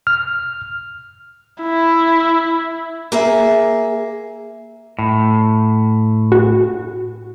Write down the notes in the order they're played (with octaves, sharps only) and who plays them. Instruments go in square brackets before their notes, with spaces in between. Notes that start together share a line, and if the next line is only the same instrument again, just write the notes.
[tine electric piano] F6
[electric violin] E4
[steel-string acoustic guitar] A#3 G#4 E5
[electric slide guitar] A2
[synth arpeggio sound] F#4